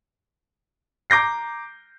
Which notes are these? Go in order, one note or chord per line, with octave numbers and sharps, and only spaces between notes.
A#5 D6 G6 A#6 C7